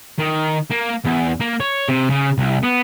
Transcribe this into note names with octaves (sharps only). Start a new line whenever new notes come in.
D#3
A#3
E2
A#3
C#5
C3
C#3
C2
B3